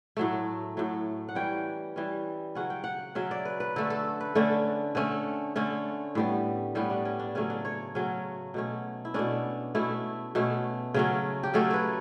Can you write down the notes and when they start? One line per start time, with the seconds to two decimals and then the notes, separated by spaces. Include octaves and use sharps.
0.17 A2 F#3 A3
0.77 A2 F#3 A3
1.29 F#5
1.35 E3 G3 C#4 G5
1.96 E3 G3 C#4
2.55 C#3 F#3 C#4 F#5
2.70 G5
2.84 F#5
3.15 C#3 F#3 C#4 E5
3.31 D5
3.45 B4
3.60 B4
3.76 D3 A3 C#4 A4
3.90 A4
4.21 B4
4.35 D3 A3 C#4 D4
4.95 D3 A3 C#4
5.56 D3 A3 C#4
6.15 A2 G3 B3
6.75 A2 G3 B3 C#4
6.90 D4
7.05 C#4
7.19 D4
7.35 C#3 F#3 A3 C#4
7.50 D4
7.65 C#5
7.95 C#3 F#3 A3 C#4
8.54 B2 A3 C#4
9.05 E4
9.14 B2 A3 C#4 D4
9.75 B2 A3 C#4 E4
10.35 B2 A3 C#4
10.94 C#3 F#3 A3 C#4
11.43 G4
11.54 C#3 F#3 A3 C#4 A4
11.70 B4 C#5